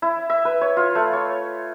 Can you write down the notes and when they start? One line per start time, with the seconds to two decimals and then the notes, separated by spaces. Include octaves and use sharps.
0.02 E4
0.30 E5
0.45 B4
0.61 C#5
0.77 F4
0.95 A3
1.13 C#5